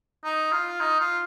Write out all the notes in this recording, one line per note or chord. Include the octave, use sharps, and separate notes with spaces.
D#4
F4
D#4
F4